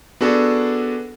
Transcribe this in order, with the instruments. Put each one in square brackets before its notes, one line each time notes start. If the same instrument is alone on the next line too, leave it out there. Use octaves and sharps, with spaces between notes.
[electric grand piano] B3 D4 F#4 G#4 A4